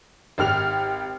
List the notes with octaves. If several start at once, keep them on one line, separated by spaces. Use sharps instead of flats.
G#1 G4 F6 F7